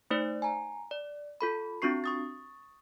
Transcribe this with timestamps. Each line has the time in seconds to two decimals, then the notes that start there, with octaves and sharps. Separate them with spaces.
0.11 A3 D#4 C5 D5
0.42 G#5 A#5
0.91 D5
1.41 F4 A4 B5
1.82 C4 D4 F4 F#4 C#6 C7
2.04 C#6 D#6 A6